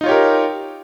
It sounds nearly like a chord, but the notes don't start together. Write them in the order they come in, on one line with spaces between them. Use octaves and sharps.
D#4 F4 C#5 G4 A#4